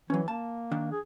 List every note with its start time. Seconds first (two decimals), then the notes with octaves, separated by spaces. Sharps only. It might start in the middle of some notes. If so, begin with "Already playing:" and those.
0.10 E3 F#3 C#4
0.28 A#3 A5
0.71 D#3 D4
0.92 G#4